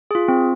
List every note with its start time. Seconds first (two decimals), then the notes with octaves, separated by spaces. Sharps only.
0.11 F4 G#4
0.28 C4